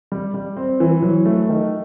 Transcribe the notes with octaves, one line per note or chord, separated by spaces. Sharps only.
G3
G3
C4
E3
F#3
A3
D#3